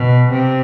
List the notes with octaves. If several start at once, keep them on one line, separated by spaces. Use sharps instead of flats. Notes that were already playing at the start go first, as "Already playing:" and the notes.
Already playing: B2
C3